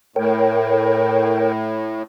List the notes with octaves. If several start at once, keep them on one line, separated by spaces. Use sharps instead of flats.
A2 A#4 C#5 G5